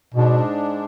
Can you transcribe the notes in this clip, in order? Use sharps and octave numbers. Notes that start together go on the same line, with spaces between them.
G#2 B2 G#3 D4